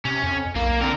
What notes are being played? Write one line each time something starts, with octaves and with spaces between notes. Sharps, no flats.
C3 C#4
F2
B1 A#3
D3 C4 A#4